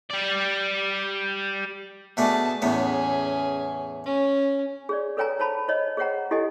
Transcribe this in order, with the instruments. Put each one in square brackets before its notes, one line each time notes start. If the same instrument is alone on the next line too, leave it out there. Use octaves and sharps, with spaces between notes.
[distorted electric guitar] G3 D5
[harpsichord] B2 A3 D4 [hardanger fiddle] G#4 A5
[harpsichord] E2 A2 B3 [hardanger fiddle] C#4 G#4
[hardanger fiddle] C#4
[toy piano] G#4 C#5 D5
A4 B4 C#5 G5 G#5 A#5
C5 C#5 A5 B5
C5 C#5 D#5
G#4 C5 C#5 F#5 G5 A#5
E4 G4 A4 D#5 G#5